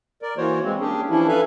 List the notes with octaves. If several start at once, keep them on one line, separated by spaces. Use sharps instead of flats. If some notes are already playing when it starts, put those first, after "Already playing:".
A#4 D5
E3 A#3 F#4 C5 C#5
G3 G#3 C4
A#3 C#4 D4 G4 G#4
E3 F3 C#4 D4 E4
A4 B4 E5 F5 G#5